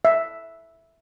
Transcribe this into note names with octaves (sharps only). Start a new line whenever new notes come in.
E5